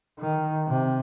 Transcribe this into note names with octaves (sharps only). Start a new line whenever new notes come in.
D#3
C3